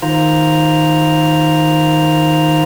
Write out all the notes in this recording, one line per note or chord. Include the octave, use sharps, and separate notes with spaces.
D#3 F4 C5 A#5